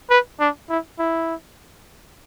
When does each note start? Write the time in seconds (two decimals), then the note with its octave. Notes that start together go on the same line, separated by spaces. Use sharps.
0.10 B4
0.40 D4
0.69 E4
0.99 E4